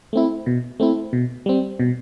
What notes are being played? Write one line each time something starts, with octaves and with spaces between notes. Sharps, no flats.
A3 C4 E4
B2
A3 C4 E4
B2
G3 C4
B2